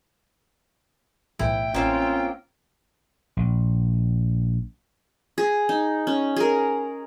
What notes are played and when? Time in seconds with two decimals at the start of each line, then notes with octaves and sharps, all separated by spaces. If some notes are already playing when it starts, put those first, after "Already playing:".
1.39 B1 A2 E3 E4 G5
1.74 A1 A#3 C4 C#4 F4
3.37 A#1
5.38 G#4
5.69 D#4
6.07 C#4
6.36 G#4 A#4